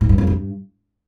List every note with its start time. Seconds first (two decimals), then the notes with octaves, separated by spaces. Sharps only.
0.01 A2
0.09 G2
0.18 F2
0.27 G2